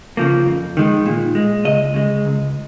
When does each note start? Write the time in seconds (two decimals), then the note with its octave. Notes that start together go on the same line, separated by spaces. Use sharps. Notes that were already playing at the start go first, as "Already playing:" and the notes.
0.17 C#3 F3 A#3
0.46 F2
0.77 D#3 G#3
1.06 A#2
1.35 G#3
1.65 C#2 D#5
1.94 C#3 G#3
2.24 C#2